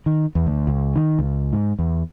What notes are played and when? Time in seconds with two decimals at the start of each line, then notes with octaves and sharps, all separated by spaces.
0.06 D#3
0.35 E2
0.47 D2
0.67 C#2
0.96 D#3
1.19 C#2
1.53 G#2
1.79 E2